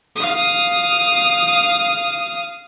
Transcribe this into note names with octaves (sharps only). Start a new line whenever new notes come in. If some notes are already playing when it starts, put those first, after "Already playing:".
F5 D#6